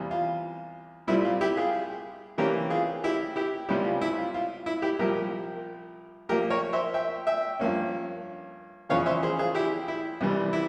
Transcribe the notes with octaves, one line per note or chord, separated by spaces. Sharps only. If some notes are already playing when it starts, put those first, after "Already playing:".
Already playing: E2 C3 G3 A#3
F4
C2 A#2 G3 C4 E4
F4
E4 G4
F4 G#4
C3 E3 A#3 C#4 G4 A#4
F4 G#4
E4 G4
E4 G4
C#2 C3 G3 C#4 E4 G4
F4
E4
F4
F4
E4
E4 G4
C2 A#2 F3 G4 A#4
A#2 F3 A#3 G4 A#4
A#4 C#5
C5 E5
E5 G5
E5 G5
G2 F3 A#3 C#4
E2 C#3 F3 C#5 F5
C5 E5
G#4 C5
F4 G#4
E4 G4
E4
C2 C3 E3 G3
E4